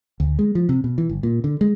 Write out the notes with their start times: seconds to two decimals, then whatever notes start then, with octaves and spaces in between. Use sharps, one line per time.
0.20 D2
0.39 G#3
0.55 F3
0.69 C3
0.84 B2
0.98 E3
1.09 G1
1.23 A#2
1.44 D3
1.61 G#3